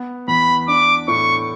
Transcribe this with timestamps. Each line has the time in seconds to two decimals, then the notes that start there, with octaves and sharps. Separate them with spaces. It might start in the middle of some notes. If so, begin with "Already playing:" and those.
Already playing: B3
0.28 E2 B5
0.68 D4 D6
1.08 A2 C#6